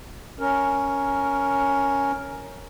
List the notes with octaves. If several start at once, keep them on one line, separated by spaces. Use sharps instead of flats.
C#4 A#4